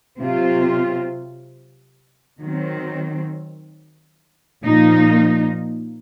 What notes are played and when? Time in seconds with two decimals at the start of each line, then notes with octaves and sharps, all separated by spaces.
0.17 C3 F#3 C4 F4
2.40 D#3 F#3 C4
4.63 A#2 F3 A#3 D#4